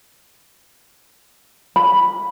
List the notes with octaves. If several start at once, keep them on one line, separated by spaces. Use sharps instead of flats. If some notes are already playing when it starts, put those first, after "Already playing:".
B5